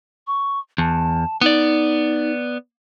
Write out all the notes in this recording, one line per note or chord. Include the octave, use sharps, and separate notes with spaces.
C#6
E2 A5
B3 D#4 D5